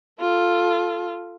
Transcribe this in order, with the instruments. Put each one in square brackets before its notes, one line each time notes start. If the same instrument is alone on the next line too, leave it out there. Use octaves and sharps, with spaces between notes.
[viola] F4 A4